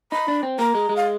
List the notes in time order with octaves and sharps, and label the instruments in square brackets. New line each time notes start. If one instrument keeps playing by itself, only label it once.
[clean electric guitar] D#4 [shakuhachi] B5
[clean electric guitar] D4
C4
[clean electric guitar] A#3 [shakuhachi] A#5
[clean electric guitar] G#3
G#3
[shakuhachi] F5